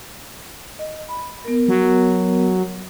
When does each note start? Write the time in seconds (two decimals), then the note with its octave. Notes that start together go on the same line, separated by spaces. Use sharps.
0.79 D#5
1.09 B5
1.44 B3 A#4
1.68 F#3